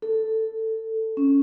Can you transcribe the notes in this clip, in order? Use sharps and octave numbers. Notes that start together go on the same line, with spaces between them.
A4
C#4